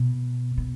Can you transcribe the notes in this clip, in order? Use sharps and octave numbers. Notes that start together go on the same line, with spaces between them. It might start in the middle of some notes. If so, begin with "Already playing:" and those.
Already playing: B2
B2